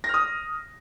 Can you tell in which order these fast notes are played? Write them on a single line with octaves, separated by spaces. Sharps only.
A#6 F6 D#6